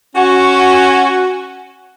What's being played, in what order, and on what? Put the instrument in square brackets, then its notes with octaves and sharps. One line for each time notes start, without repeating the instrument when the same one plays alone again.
[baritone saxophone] C#4 [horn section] F#4